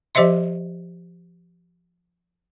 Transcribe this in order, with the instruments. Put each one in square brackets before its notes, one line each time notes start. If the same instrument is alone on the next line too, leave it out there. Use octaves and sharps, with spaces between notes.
[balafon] F3 G4 C5 D#5 E5 C6